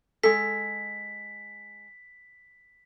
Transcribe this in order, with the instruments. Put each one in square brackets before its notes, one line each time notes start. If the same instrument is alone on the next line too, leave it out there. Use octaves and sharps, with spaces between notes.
[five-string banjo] G#3 A4 [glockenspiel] B6